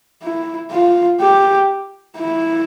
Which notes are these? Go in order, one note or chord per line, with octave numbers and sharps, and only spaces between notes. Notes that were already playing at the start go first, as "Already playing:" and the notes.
E4
F4
G4
E4